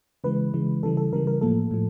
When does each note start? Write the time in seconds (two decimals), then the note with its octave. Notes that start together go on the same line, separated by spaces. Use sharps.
0.24 C#3 E3 G#3 B4
0.54 C#3 E3 G#3
0.83 C#3 E3 G3 A4
0.97 A4
1.13 C#3 E3 G3 A#4
1.27 A#4
1.41 A2 F3 A#3 A4
1.71 A2 F3